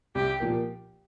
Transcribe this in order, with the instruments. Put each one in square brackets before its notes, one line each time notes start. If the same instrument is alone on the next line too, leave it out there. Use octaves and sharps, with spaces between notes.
[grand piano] C2 [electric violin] G4
[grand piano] A#2 F3 A#3